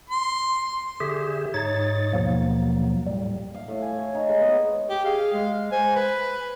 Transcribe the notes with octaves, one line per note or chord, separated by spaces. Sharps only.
C6
D3 G4 G#4 E5
G#2 D#4 C#5 A6
D#2 B2 F3 F#3 A#3
A2 G3
F5
A2
G#5
C#5
D#4
G#3
B3
G4
G#4 F5
G#3
C5 G#5
B4